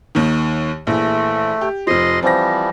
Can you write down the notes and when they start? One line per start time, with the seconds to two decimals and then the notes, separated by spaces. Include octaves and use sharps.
0.15 D#2 D#3
0.87 A#1 E3 A3
1.61 G4
1.87 F1 F3 D#5 C6
2.23 E3 F3 G3 C4 A#6